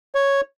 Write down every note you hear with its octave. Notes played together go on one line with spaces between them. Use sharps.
C#5